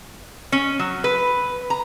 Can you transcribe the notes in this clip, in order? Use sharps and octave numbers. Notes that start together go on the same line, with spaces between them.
C#4
F#3
B4
A#5